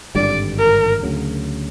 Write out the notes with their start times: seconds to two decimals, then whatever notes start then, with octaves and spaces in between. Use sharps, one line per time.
0.15 G#1 G2 D3 G3 D5
0.58 A#4
1.03 D2 C#3 F#3